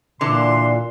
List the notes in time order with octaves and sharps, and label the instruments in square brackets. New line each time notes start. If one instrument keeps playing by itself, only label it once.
[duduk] A#2 [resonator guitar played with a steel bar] D3 E3 [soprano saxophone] C6